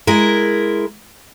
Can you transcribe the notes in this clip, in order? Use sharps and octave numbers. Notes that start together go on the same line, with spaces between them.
G#3 E4 A#4